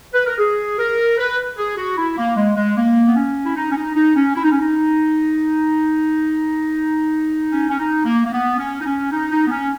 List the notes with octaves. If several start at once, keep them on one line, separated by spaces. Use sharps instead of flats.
B4
A#4
G#4
A#4
B4
G#4
F#4
E4
A#3
G#3
G#3
A#3
B3
C#4
E4
D#4
C#4
D#4
D#4
C#4
E4
D#4
C#4
D#4
C#4
C#4
D#4
A#3
A#3
B3
C#4
D#4
C#4
D#4
D#4
B3
C#4